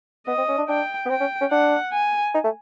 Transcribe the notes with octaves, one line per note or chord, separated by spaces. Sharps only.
B3 D#5
C4
C#4
D4
D4 G5
B3
C4 G5
C#4
C#4
D4 F#5
G#5
D#4
A3